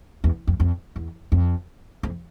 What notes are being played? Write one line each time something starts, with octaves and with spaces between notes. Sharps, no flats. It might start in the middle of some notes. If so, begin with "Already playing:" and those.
E2
F2
F2
E2
F2
F2